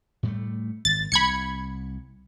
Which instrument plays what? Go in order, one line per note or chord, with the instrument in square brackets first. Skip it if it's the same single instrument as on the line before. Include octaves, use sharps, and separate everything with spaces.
[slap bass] A2 G3 A3
[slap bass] G#1 [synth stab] A6
[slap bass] C2 [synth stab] B5 G#6 C#7